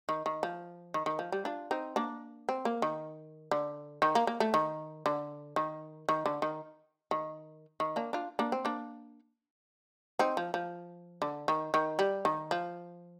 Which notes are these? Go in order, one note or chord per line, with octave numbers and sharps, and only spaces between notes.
D#3
D#3
F3
D#3
D#3
F3
G3
D4 F4
C4 D#4
A#3 D4
C4
A#3
D#3
D3
D#3
A#3
A#3
A3
D#3
D3
D#3
D#3
D3
D#3
D#3
D#3
A#3 D4
D4 F4
A#3 D4
C4
A#3 D4
C4 D#4
F3
F3
D3
D#3
D#3
G3
D#3
F3